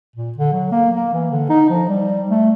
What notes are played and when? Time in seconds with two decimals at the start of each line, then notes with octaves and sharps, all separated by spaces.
0.16 A#2
0.38 D3
0.53 F#3
0.72 A#3
0.95 A#3
1.13 E3
1.31 D3
1.49 D#4
1.70 F3
1.89 G3
2.30 A3